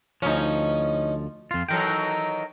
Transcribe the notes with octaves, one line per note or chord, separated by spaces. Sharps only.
D2 F3 C#4 D#4
F2 F4
D#3 E3 F#3 A4 A#4 G5